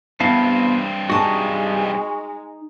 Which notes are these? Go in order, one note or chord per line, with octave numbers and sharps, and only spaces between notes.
G2 B3 C4 E4 F5 A5
G#3 D#4 F#4 A5